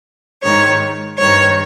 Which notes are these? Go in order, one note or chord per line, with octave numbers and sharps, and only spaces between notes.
G#2 D#3 C#5
G2 D#3 C#5